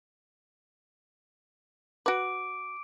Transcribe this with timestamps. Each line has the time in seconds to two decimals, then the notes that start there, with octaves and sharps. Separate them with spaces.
2.06 F#4 B4 D6 D7